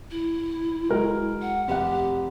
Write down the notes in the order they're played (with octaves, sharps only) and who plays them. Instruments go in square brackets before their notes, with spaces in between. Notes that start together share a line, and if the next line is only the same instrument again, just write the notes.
[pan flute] E4
[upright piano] F#3 G#3 A#4
[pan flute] F#5
[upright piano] F1 F#5 [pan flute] G4